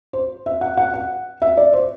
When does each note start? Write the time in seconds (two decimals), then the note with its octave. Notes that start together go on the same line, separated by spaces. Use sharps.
0.13 C5
0.46 E5
0.61 F#5
0.77 F#5
0.94 F#5
1.42 E5
1.57 D5
1.73 C5